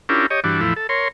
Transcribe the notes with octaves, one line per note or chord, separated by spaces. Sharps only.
C#4 D4 E4 F4 G4 A#4
G4 C#5 D#5
G2 E3 D4 F#4
E2 A2 F3 E4
A4
A#4 C#5 C6